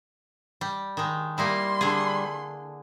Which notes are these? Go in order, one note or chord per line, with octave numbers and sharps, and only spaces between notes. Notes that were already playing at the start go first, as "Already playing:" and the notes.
G3
D#3 G#3
G3 A#3 D#4 E4 C6
D3 G#4